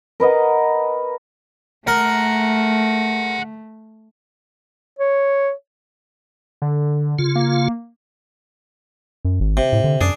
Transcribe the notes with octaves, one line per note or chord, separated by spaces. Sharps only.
A#4 B4 D#5 F#5
A3 G#4 A#4 F#5
C#5
D3
C#3 F4
A#3
F#2
G#1
C3
A2
D3
F#2 D4 G#4